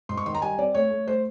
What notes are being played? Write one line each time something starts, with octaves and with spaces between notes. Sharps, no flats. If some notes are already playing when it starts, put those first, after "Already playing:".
G#2 C6
C#6
D#3 C6
A#5
G3 G#5
C4 D5
A3 C#5
A3
A3 C5